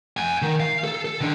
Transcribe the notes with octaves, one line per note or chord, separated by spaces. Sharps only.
F#5 G#5
D#3
F5
A4
A4
D#3 D4